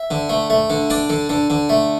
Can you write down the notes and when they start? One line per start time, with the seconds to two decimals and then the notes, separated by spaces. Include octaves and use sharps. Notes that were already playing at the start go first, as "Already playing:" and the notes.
Already playing: E5
0.11 D3
0.29 A3
0.50 A3
0.70 D3
0.90 D4 D5
1.10 D3
1.29 D3
1.50 D3
1.69 A3